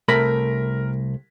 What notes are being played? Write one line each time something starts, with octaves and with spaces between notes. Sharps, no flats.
C2 A3 A#4 B5 A#6 B6